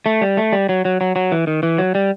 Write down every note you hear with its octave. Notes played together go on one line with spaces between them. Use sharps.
A3
G3
A3
G3
F#3
F#3
F#3
F#3
E3
D#3
E3
F#3
G3